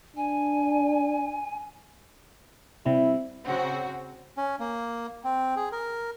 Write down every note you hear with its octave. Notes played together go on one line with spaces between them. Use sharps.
D4 G#5
C3 G3 E4
C#3 C4 F#4
C#4
A#3
C4
G#4
A#4